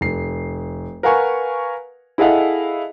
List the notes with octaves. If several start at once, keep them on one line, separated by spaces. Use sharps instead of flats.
F1 C7
A#4 B4 F5 F#5 G#5 C#6
E4 G#4 A4 D#5 F5 F#5